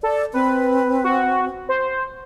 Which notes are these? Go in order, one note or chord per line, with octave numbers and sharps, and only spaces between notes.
A4 D5
C4 B4
F#4
C5